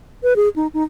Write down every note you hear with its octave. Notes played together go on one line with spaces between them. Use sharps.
B4
G#4
D#4
D#4